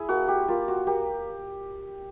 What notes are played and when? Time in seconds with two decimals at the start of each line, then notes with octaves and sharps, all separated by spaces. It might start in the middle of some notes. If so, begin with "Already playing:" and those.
Already playing: E4 G#4
0.09 A#3 F#4
0.28 G4
0.48 A#3 F4
0.68 F#4
0.87 A#3 G4